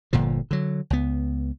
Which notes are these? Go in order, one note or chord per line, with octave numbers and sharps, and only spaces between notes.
G1 A#2 D3 F3
D3 F#3
C#2 B3